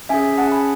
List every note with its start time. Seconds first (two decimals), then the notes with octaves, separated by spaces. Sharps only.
0.09 C#4 G#4 E5 G#5
0.38 C#4 G#4 F#5 A5
0.52 G#5 B5